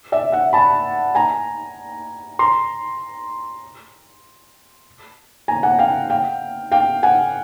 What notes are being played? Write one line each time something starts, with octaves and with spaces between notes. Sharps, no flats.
D5 E5
E5 F#5
A5 B5
G#5 A#5
A#5 C6
G#5 A#5
F#5 G#5
F5 G5
F5 G5
F5 G5
F#5 G#5